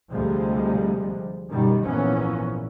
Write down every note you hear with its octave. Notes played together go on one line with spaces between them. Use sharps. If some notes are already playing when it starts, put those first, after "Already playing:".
D2 C3 F3 G3 G#3
F#2 B2 D#3 G3
G#1 A#2 E3 F3 B3 C#4